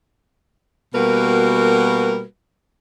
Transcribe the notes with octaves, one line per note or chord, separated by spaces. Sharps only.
B2 G3 A#3 F#4 A#4 B4